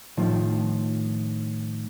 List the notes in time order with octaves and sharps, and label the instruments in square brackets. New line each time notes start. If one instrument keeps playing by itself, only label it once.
[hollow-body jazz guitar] A2 D#3 F3